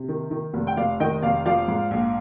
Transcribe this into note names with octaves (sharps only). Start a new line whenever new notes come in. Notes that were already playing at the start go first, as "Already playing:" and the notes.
Already playing: C3
D#3
D#3
F1
G5
F1 D5 F5
D#3 D#5 G5
F1 D5 F5
F3 D5 F5
G#2
A#1